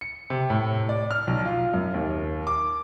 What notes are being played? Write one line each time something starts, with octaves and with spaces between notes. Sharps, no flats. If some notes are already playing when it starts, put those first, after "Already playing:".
C#7
C3
A2
D5
F6
B1
F4
F#2
D#2
D6